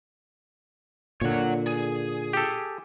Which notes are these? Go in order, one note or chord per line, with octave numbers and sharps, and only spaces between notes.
A#2 D3 C#5 F#5
G#4
G4 A4